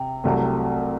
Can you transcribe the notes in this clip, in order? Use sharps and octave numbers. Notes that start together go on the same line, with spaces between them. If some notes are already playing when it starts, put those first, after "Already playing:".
Already playing: C3 G5
C2 C3 F#3 A3